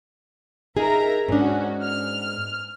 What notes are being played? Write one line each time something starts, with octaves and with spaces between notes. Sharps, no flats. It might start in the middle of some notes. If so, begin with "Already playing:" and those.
D#4 G#4 A#4 E5 A#5
G#2 C#4 D4 F#4
F6